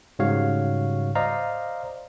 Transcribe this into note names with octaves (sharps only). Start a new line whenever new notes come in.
G#2 C#3 G3 F#4 C#5 F5
C5 D5 D#5 F5 A#5